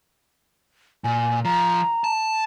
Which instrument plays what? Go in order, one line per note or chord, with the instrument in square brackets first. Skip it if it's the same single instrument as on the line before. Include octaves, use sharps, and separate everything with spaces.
[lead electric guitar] A#2 [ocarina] G#5
[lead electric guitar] F3 [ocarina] A#5
[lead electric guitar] A5